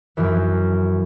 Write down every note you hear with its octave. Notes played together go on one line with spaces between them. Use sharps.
F#2 E3